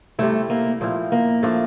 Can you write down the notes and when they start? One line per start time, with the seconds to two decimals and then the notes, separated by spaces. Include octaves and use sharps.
0.19 C3 G3 A3 C4 E4
0.50 A#3
0.81 A#2 F3 C4 E4
1.12 A#3
1.43 F3 A3 D4